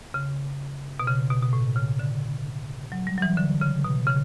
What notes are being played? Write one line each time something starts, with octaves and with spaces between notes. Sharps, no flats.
C#3
B2
C#3
B2
B2
A2
C#3
D3
F#3
G3
F#3
E3
D3
C#3
B2
C#3